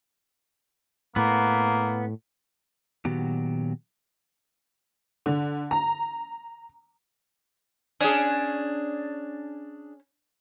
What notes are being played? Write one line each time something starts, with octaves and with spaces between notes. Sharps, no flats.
A2 A#3 B3
A#2 D#3 F#3 B3 F#4 G4
D3
A#5
C#4 D4 G#4